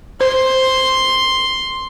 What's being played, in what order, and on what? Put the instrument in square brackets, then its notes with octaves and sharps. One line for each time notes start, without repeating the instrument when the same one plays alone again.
[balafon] C5 [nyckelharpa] C6